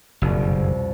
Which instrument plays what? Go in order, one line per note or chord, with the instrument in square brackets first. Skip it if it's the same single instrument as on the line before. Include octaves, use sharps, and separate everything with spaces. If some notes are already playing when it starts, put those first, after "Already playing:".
[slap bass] F#1 [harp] C2 F2 B2